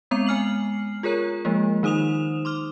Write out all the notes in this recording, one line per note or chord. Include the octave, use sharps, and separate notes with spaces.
G#3 B3 C4 A#5 F7
G#3 G#5 F6 C7 F#7
F4 G#4 A#4 C#5 A#5
F3 G#3 A#3
D#3 D#4 C5 D#6 E7 F7
C6 D6 F6